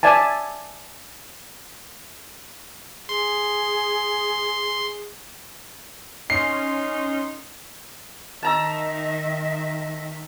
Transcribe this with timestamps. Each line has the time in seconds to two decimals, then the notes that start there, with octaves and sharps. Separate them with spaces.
0.03 D5 E5 G#5 A5
3.09 G#4 C6
6.30 C#4 D#4 C6 C7
8.43 D#3 D#5 E5 A5 A#5 E6